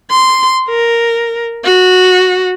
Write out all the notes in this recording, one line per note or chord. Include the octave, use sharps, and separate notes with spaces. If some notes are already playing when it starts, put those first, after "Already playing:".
C6
A#4
F#4